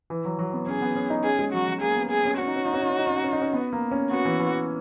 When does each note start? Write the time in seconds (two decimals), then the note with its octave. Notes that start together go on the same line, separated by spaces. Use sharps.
0.10 E3
0.25 F#3
0.39 F#3
0.53 B3
0.67 C#4 G#4
0.82 B3
0.96 C#4
1.10 D#4
1.24 C#4 G#4
1.39 G#3
1.53 F#3 F#4
1.68 F#3
1.81 A#3 G#4
1.97 B3
2.11 G#4
2.25 C#4
2.39 C#4 F#4
2.48 D#4
2.56 C#4
2.65 D#4
2.74 C#4
2.81 D#4
2.90 C#4
2.99 D#4
3.07 C#4
3.16 D#4
3.24 C#4
3.33 D#4
3.42 C#4
3.53 B3
3.73 A#3
3.91 C#4
4.11 B3 F#4
4.25 E3
4.39 E3